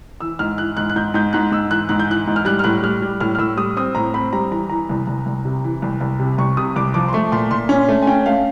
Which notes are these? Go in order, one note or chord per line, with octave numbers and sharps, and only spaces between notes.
E3 E6
G#2 F6
E3 F#6
G#2 F#6
F#6
G#2 G6
G#2 G6
G#2 F#6
G#2 E6
E3 F#6
G#2 F#6
G6
E3 F#6
G#2
F6
G3 F#6
F6
A2 F#6
G3 F6
G3
A2 F6
F6
A2 E6
G3 D#6
C4 D#6
A2 A#5
C4 B5
G3 A#5
E3 A#5
E3 A#5
C2
C2
C2
C3
E3
C2
C2
C3
C2 C#6
C3 D#6
C2 D6
F3 D6
C6
A3 C#6
A#2 C6
A#2 C6
C#4
A3
G#5
C#4 G5
A3 F5